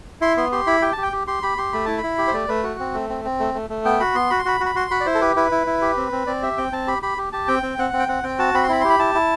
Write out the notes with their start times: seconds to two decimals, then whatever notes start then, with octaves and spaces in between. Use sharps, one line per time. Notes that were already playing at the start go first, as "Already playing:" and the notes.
0.21 E4 C6
0.37 B3 C6
0.52 G4 C6
0.67 E4 B5
0.82 G4 G5
0.93 G4 A5
1.03 G5
1.13 G4
1.27 G4 C6
1.43 G4 B5
1.58 G4 C6
1.73 A3 B5
1.86 E4 A5
1.98 B5
2.03 E4
2.18 G4
2.27 C5
2.33 A3 D5
2.48 A3 B4
2.63 F#4
2.80 C4
2.94 A3
3.10 C4
3.25 C4
3.39 A3
3.54 A3
3.70 A3
3.85 B3 G5
4.00 F#4 B5
4.15 B3 C6
4.30 F#4 B5
4.39 C6
4.45 F#4 B5
4.60 F#4
4.66 B5
4.75 F#4 C6
4.91 F#4 B5
5.01 D5
5.06 E4 C5
5.15 A4
5.21 G4 B4
5.36 E4 B4
5.51 E4
5.67 E4
5.82 G4
5.97 C4
6.12 C4
6.27 C4 D5
6.42 G4 E5
6.58 C4 G5
6.72 C4 A5
6.88 G4 B5
7.02 G4 B5
7.18 G4
7.32 G4 A5
7.48 C4 G5
7.63 C4
7.78 C4 F#5
7.93 C4
7.99 G5
8.08 C4 F#5
8.23 C4 G5
8.39 F#4 A5
8.54 C4 B5
8.63 C6
8.69 E4 B5
8.81 G4 C6
8.90 B5
8.99 E4 A5
9.15 E4